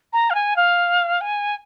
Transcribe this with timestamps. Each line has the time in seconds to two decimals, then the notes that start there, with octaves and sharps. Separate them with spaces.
0.13 A#5
0.30 F5
0.35 G#5
0.56 F5
1.21 G#5